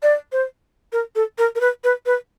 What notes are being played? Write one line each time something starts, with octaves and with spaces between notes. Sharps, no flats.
D5
C5
A#4
A4
A#4
A#4
B4
B4
B4